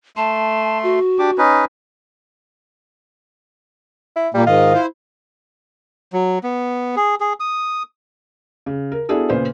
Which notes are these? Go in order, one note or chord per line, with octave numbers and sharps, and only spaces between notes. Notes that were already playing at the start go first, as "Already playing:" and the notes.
A3 A5 C6
F#4
D4 G4 D6
C#4 D#4 B4
E4
A#2 G3 A#3
G#2 D#3 F4 D#5
E4 C5
F#3
B3
G#4
G#4
D#6
C#3
A#4
B3 D4 E4 F#4 G#4 A4
A#2 C#3 G#4 B4 C5